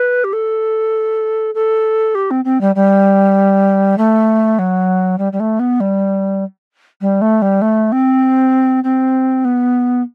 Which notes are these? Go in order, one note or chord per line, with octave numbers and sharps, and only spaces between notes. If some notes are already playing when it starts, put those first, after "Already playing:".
Already playing: B4
G4
A4
A4
G4
C4
C4
G3
G3
A3
F#3
G3
G3
A3
B3
G3
G3
A3
G3
A3
C4
C4
B3